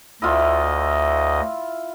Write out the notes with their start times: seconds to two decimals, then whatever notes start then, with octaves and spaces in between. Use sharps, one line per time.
0.22 D2 E4 F4 D#5